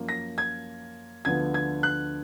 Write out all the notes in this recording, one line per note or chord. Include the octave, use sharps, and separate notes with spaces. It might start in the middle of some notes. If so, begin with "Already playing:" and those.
Already playing: F#2 F3 A#3
A#6
G#6
D2 D3 F3 B3 G#6
G#6
F#6